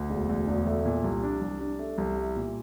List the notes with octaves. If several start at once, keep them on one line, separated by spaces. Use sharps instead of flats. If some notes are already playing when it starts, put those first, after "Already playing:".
Already playing: D2
E1
D2
E1
A3
A#2
C2
D4
C2
D4
A3
C2
E4
A#2